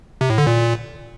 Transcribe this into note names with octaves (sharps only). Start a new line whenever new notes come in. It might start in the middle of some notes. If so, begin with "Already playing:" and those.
C3
A2
D3
A#2